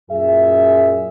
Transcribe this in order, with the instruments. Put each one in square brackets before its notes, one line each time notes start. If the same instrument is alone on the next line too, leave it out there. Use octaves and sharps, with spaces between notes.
[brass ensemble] F#2 A#2 G#4 E5